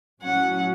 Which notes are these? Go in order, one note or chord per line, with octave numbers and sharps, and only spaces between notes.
A2 F#3 C#4 F#5